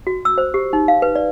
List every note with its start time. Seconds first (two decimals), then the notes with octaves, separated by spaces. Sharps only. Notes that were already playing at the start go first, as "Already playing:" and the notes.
0.07 F#4
0.25 E6
0.38 C5
0.54 G4
0.73 D#4
0.88 F5
1.02 B4
1.15 D5